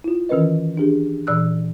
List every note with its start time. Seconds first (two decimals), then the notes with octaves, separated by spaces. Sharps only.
0.04 E4 F4
0.29 D#3 E3 C#4 A#4 B4 D#5
0.77 D4 G4 G#4
1.27 A#2 E3 D5 E6 F#6